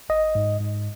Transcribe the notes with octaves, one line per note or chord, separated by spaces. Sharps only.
G#1 D#5
G#2
G#2